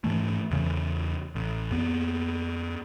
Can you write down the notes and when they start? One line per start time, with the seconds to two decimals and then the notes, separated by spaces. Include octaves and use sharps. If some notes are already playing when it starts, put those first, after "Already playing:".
0.04 G#2 E3 A3
0.51 E2 C#3 E3
1.35 A1
1.71 F2 B3